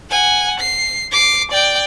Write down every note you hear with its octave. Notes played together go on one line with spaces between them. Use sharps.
F#5 G#5
C7
D6 C7
D5 G5